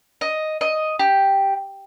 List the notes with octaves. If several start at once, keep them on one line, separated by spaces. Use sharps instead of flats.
D#5
D#5
G4